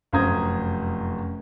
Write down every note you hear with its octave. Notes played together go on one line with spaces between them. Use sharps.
F1 F#2 C5 A#5 D#6 G#6